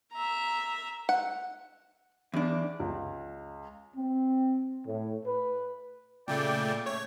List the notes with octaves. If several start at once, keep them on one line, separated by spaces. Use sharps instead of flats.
E5 A#5
F#5
E2 D4
C#2
C4
A2
B4
A#2 C#3 A3 D5 G5
A3 C#5